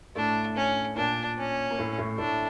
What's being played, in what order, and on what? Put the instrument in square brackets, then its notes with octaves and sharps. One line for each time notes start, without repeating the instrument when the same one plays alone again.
[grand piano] A2 A3 [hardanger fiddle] D4
[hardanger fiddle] C#4
[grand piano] A#2 A#3 [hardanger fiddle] D4
[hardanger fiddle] C#4
[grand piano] A#3
A2 A3
A2 A3
[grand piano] A2 A3 [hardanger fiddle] D4